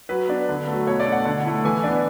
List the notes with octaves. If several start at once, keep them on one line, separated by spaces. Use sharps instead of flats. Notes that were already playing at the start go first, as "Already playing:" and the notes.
F#3 B4
B3 D4
D3
F#3 A3
B2 C#5
D5
A3 D4
F#5
D3
A3 E4
E3 G#5
B3 D4